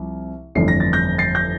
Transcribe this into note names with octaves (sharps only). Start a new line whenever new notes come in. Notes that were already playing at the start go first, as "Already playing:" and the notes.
Already playing: C2 C3 F3
G1 F2 E3 A3 D4 C7
A#6
A6
G6 A#6
A6 C7
G6 A#6